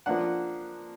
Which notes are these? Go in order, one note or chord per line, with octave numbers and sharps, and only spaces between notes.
F3 A#3 D4 F#5